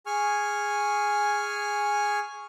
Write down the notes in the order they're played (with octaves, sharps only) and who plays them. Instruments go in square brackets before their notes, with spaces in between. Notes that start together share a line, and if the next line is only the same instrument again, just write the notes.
[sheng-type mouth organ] G#4 G#5 C#6 F6